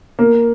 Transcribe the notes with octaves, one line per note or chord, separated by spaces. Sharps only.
A#3